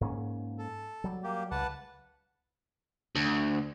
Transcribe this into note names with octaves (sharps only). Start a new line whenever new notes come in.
G#2 A#3 C#4
A4
F#3 G3
A#3 G4
C#2 B4 F#5 A5
D2